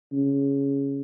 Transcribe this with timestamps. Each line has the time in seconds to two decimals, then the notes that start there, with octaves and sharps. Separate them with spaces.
0.13 C#3